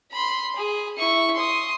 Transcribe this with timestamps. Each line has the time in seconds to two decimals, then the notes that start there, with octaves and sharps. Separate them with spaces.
0.12 B5 C6
0.56 G#4
0.98 E4 C#6
1.35 C6 D#6